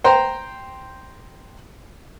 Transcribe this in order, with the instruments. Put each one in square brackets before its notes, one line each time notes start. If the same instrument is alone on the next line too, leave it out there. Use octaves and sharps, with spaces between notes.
[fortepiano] C5 G5 A#5 C6